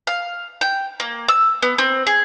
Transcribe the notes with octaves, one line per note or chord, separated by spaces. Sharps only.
F5
G5
A#3
E6
B3
C4
G#4